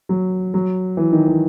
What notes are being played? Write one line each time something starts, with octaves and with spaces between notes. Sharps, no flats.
F#3
F#3
E3
D#3
E3